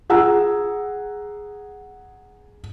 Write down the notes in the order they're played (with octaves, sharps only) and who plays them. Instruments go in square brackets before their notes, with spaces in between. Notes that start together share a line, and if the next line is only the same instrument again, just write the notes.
[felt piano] G#4 F#5 A#5 E6